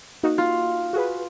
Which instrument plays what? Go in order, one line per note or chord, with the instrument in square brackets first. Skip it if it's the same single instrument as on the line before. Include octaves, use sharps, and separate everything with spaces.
[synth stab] A#3 D#4 F#4
[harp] F4
[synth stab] F#4 G#4 B4